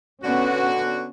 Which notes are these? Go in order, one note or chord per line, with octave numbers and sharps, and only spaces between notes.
D3 B3 C#4 F#4